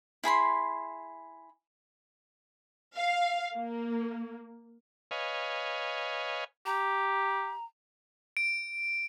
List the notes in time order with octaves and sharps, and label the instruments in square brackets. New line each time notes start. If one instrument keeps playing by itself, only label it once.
[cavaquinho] E4 G#4 B5 C6
[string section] F5
A#3
[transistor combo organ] B4 C#5 D#5 F5 G#5
[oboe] G4 [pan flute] A#5
[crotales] D7